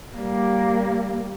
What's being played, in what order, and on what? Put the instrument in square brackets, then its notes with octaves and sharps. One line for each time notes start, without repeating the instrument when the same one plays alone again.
[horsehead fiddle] G3 A#3